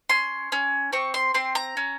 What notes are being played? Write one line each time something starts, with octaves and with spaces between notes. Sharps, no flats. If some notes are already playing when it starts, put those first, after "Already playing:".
C#4 C6
C#4
C4 C#6
C6
C4 C6
A#5
C#4